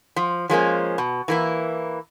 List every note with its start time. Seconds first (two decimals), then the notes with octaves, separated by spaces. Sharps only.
0.16 F3
0.50 F3 G#3 A#3 C#4
0.98 B2
1.28 E3 A#3 E4